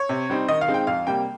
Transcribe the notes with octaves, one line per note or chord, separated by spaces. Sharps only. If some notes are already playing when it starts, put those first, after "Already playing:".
Already playing: C#5
C3
G3 C4 D#4
D#3 D#5
F5
G#3 C4 D#4
G5
F2 F5
C3 G3 A#3 G5